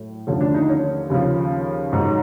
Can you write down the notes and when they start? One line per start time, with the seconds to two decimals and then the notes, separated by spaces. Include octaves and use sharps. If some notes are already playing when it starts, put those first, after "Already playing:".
Already playing: A2 F#3
0.27 D#2 D3 F3 A3 C#4
0.41 D4
0.54 D#4
0.69 C#4
1.10 D#2 C#3 F3
1.93 G#2 D#3 F#3